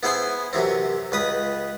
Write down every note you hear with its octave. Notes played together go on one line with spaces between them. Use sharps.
B3 E4 G#4 C5 G5 G#5
F#2 C3 E3 C4
C#2 B4 D#6